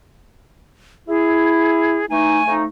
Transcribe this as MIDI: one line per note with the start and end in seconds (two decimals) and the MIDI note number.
1.08 2.01 64
1.08 2.06 68
2.10 2.40 52
2.10 2.40 57
2.10 2.40 63
2.10 2.53 80
2.46 2.63 41
2.46 2.63 57
2.46 2.63 63